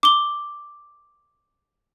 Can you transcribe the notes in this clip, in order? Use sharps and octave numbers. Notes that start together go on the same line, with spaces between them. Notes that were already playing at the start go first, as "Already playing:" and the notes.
D6 G7